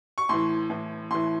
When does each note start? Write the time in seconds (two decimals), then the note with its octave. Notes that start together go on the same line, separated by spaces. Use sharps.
0.18 C#6
0.29 A2 E3 C6
0.70 A2 E3
1.11 A2 E3 C6